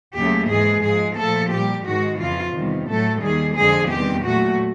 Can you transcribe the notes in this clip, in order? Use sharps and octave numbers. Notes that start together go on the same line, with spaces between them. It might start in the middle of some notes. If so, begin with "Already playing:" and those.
D#2 C#3 F#3 A3 G4
G#2 E3 G#3 G#4
G#2 F3 G#3 G#4
A#2 F3 A3 A4
A#2 G3 G4
G#2 D#3 G#3 F#4
F2 C#3 E3 F4
E2 C3 D#3 G3
A2 F#3 A3 A4
D#2 D#3 G3 G#4
F2 D3 F3 G#3 G#4
E2 C3 D#3 G3 G4
A#2 F#3 A3 F#4